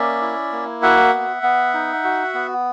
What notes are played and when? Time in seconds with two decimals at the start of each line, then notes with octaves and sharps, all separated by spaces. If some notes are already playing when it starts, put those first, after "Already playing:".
Already playing: A#3 C#4 D5 E5
0.22 E4
0.52 A#3
0.83 F#4 E5 F#5
1.13 B3
1.43 B3
1.74 D#4
2.04 F#4
2.34 B3